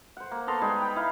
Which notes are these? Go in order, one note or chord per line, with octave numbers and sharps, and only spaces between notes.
C5 F#5
A#3
B3 A4 A#5 C6
G3 G#3 D#4 G#4
G5 A#5 B5
E4 F5